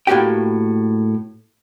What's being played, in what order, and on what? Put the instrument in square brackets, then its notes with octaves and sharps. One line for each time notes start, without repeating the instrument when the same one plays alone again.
[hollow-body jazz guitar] A2 A#3 F#4 G4 G5